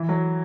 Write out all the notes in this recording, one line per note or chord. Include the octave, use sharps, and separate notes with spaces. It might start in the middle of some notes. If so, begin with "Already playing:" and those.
Already playing: E3
F#3